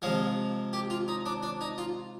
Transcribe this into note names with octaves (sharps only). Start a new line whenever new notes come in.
C3 F3 G#3 F5
G4
F4
D#4
D4
D4
D#4
F4